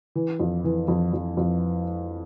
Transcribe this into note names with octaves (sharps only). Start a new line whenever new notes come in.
E3
F2
E3
F2
F2
F2